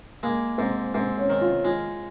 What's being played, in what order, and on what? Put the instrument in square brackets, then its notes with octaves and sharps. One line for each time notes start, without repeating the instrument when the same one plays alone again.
[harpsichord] G#3 [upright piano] A#3
[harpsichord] G#2 [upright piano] C4
[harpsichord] G#2 [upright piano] C4
[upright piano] C#4
[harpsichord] D#3
[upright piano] F4
[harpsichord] G#3 [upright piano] F4